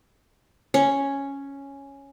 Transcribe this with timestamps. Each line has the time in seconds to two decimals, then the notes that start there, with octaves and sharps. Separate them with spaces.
0.74 C#4